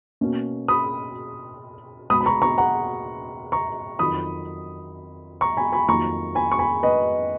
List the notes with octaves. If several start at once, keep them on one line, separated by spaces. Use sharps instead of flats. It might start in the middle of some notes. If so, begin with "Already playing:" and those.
B2 A#3 C#4
B5 D#6
B2 G#3 B3 B5 D#6
B5
A#5 C#6
A#5 C#6
F#5 A#5
A#5 C#6
F2 D#3 F#3 B5 D#6
A#5 C#6
G#5 B5
G#5 B5
F2 D#3 F#3 A#3 A#5 C#6
G#5 B5
C#6
G#5 B5
B4 D#5